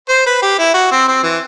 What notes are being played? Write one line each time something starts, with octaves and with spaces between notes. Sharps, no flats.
C5
B4
G4
E4
F#4
C4
C4
E3